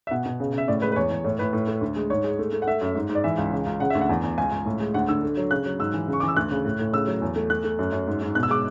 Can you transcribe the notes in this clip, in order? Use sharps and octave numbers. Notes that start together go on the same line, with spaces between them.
E5
B2 F#5
B2
C#3
C#3 E5
A2 D5
G#3 B4
B4
E2 C#5
E2
A2 C#5
A2 B4
A2
A3
D2
G#3
G#2 C#5
G#3
A3
A3
F#5
A3 E5
F#2
G#2
G#2
D5
E3 E5
C#2
C#3
C#2
C#3 F#5
D2 E5
F#5
E2
E2
C#2 G#5
C#2
A2
G#3
D2 F#5
D3 E6
A3
F#3
C#3 F#6
F#3
G#2 E6
E3
C#3
C#6
E3 D6
E6
D2 F#6
C#3
A2
A2
C#3 E6
F#3
E2
A3
A3 F#6
A3
F#2
F#2
G#2
G#2
B2 F#6
E6
G#3 D6